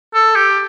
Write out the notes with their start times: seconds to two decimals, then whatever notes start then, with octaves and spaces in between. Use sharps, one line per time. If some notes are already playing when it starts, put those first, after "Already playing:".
0.14 A4
0.36 G4